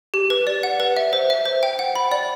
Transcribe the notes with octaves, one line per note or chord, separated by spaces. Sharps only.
G4
B4
D5
F#5
B4
E5
C5
E5
C5
G5
F#5
B5
D5